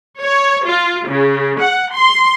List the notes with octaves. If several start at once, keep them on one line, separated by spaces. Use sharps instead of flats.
C#5
F4
C#3
F#5
C6